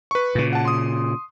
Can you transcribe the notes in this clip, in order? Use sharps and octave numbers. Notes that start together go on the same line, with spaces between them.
B4 C#6
A#2 C#3
F#5 A5
C6 D#6